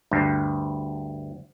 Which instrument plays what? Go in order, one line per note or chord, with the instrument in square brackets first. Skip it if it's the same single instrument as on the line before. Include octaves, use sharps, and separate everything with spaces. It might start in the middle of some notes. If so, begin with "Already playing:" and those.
[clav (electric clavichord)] D2 G2